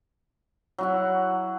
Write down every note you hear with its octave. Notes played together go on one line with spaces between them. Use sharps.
F#3 E4 F#5